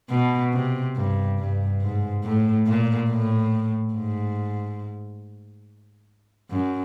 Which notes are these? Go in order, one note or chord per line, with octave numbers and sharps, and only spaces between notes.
B2
C3
G2
G2
G#2
A2
A#2
A2
G#2
F#2